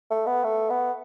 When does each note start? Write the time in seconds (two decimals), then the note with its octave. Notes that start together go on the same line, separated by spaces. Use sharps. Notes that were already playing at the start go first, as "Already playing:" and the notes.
0.11 A3
0.27 B3
0.44 A3
0.70 B3